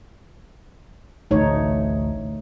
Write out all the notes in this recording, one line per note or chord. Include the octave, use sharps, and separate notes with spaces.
A1 D2 A3 D#4 C#5